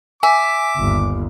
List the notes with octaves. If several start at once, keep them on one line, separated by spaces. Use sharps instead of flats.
E5 G#5 D6
G1 D#2